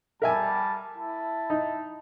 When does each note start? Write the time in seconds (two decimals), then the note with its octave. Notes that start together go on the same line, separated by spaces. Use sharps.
0.22 G3 A#4 E5 G#5 A5
0.96 E4 A5
1.50 D#4